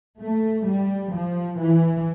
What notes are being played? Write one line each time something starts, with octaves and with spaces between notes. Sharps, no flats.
A3
G3
F3
E3